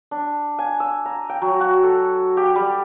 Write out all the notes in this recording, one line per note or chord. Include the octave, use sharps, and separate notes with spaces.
D4
G#5
E6
A#5
G5
F#3
F#4
A4
G4
G3